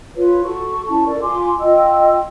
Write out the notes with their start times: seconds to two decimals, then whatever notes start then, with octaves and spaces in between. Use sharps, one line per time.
0.16 F4 B4 C#5
0.43 F#4 A4 C#6
0.89 C#4 E4 A5 C#6
1.07 A4 A#4 D5
1.22 F4 G#5 C6 D6
1.60 F4 D#5 G5 E6